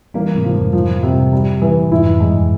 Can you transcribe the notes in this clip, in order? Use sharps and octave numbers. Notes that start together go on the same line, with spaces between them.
E3 G3 A#3
G#2 C3
F3
F2 G#2
F3
C3
G3
E3
F2 G#2 E4
F2
E2 G2 G#3